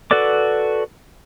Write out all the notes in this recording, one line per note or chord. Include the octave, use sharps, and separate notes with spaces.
F#4 A4 B4 D5 D6